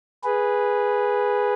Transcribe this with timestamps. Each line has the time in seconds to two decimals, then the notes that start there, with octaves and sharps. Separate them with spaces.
0.23 G#4 B4